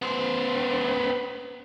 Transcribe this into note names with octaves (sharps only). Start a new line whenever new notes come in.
B3 C5